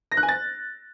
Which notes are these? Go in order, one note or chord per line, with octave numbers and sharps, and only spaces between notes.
A#6
F#6
G#5
A6